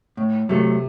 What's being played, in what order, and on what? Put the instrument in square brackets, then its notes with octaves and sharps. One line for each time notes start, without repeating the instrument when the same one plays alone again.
[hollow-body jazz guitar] A2
[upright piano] C3 [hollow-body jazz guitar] F#3 A3